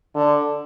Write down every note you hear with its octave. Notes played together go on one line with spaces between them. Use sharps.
D3